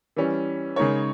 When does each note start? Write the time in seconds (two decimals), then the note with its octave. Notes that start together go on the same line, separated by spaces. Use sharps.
0.16 E3 G3 C#4
0.76 C#3 G#3 D#4 A#4 C#5